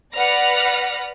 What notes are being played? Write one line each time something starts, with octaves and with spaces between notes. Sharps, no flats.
B4 D5 F#5 F6 A#6